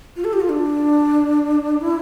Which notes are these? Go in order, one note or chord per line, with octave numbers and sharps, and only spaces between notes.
F4
A4
G4
F4
D4
E4